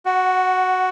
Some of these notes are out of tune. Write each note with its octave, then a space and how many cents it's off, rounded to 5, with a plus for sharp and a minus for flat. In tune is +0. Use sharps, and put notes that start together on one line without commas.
F#4 +0 F#5 +20